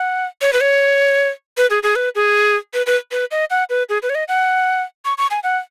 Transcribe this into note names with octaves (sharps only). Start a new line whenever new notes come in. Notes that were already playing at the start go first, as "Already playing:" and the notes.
Already playing: F#5
C#5
B4
C#5
B4
G#4
G#4
B4
G#4
B4
B4
B4
D#5
F#5
B4
G#4
B4
C#5
D#5
F#5
C#6
C#6
G#5
F#5